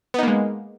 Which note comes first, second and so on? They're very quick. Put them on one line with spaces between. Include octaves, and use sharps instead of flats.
B3 D#4 A#3 G#3